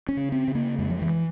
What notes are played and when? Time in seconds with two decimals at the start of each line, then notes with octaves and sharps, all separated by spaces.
0.09 C#4
0.17 C#3
0.32 C4
0.48 C#3
0.55 A#3
0.78 F2 G#3
0.90 F3
1.02 E3